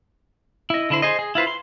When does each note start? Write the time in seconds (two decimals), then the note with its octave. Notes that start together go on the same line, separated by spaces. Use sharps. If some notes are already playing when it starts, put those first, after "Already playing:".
0.70 E4 D#5
0.90 D3 E4 C5
1.02 G#4 C5 D#5
1.19 G#4
1.35 E4 F4 B4 C5
1.47 C6